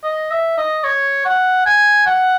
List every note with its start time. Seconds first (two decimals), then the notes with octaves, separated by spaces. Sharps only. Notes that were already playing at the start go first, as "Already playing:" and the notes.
0.03 D#5
0.30 E5
0.57 D#5
0.84 C#5
1.25 F#5
1.66 G#5
2.06 F#5